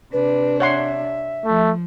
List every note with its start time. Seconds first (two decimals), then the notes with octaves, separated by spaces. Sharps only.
0.13 C3 D4 B4
0.60 C#5 E5 F#5 C6
1.46 F3 A3